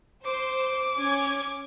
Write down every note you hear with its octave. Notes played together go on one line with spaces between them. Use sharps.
C5 D6
C#4 G#6